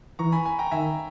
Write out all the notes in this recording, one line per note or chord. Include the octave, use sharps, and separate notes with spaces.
E3 A#5 C#6
G#5 B5
G#5 B5
G5 A#5
D#3 E5 G#5